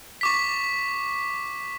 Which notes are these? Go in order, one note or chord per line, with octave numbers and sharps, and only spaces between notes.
C#6 D6 B6